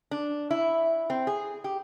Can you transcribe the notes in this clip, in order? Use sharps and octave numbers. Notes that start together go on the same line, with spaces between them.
D4
E4
C4
G#4
G4